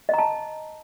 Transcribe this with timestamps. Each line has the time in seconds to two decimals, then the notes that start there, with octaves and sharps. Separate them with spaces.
0.09 D#5
0.14 A#5
0.18 A5